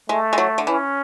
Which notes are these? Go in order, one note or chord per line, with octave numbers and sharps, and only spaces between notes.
G#3 A3
G#3
F#3
D3
E3 C#4